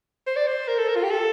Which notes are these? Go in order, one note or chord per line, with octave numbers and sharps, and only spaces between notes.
C5
D5
C5
A#4
A4
A#4
F4
G4
A4